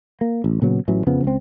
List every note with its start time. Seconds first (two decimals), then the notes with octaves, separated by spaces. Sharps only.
0.21 A#3
0.44 A1
0.62 A#2 C#3 F#3 B3
0.88 A1 A2 E3 F#3
1.07 F2 C#3 F3 B3
1.24 C#2 C4